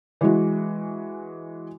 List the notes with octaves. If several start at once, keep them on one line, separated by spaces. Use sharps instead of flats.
E3 G#3 F#4